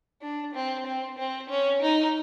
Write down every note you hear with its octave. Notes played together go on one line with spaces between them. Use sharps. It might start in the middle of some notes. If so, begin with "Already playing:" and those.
D4
C4
C4
C4
C#4
D#4